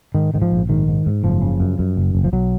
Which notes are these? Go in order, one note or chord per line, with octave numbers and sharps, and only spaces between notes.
G#2 D#3
G#2 D#3
F3
A#1
G#2 D#3
G#2
G#2
F#1 F3
C#3
F#2
F#2
F#1
F#1
F3
B1 F#3